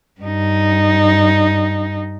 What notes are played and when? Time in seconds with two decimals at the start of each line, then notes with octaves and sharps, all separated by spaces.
0.21 G2 D#4